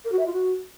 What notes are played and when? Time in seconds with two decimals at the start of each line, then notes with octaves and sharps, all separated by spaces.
0.05 A#4
0.12 F#4
0.19 E5
0.26 F4
0.33 F#4